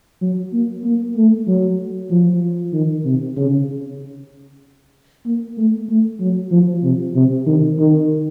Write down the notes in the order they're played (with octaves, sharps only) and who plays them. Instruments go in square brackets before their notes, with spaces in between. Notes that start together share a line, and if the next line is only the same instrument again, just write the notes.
[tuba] F#3
A#3
A#3
A3
F#3
F3
D#3
C3
C#3
A#3
A3
A3
F#3
F3
C3
C3
D#3
D#3